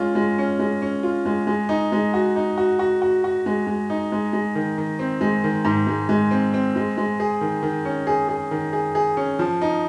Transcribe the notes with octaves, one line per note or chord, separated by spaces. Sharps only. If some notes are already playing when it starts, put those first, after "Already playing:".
Already playing: G#3 C#4 F4
G#3
C#4
G#3
C#4
F4
G#3
G#3
D#4
G#3
F#4
D#4
F#4
F#4
F#4
F#4
G#3
G#3
D#4
G#3
G#3
D#3
D#3
C4
G#3
D#3
G#2
G#3
G#3
C4
C4
G#3
G#3
G#4
D#3
D#3
C#4
G#4
G#4
D#3
G#4
G#4
C#4
F3
D#4